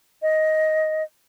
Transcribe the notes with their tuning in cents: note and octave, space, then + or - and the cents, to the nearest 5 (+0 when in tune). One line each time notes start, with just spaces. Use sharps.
D#5 +10